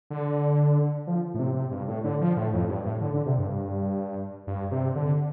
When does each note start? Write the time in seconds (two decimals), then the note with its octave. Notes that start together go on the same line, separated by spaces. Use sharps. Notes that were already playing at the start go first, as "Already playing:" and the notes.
0.10 D3
1.07 F3
1.34 A2
1.39 C3
1.55 C3
1.71 G2
1.88 A2
2.04 D3
2.21 F3
2.37 A2
2.54 F2
2.69 G2
2.85 A2
3.01 D3
3.14 D3
3.26 C3
3.38 G2
4.47 G2
4.71 C3
4.96 D3